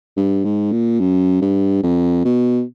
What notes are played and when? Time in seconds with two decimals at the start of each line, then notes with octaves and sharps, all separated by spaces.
0.17 G2
0.45 G#2
0.72 A#2
1.00 F#2
1.42 G2
1.83 F2
2.25 B2